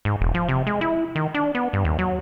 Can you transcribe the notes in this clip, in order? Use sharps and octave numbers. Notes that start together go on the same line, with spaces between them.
G#2
E1
F3
C3
G#3
E4
D#3
D4
B3
G2
D#2
F#3